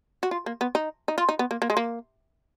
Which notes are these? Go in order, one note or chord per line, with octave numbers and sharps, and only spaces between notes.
F#4
F4
A#3
B3
D#4
D#4
F4
D#4
B3
A#3
A#3
G#3
A#3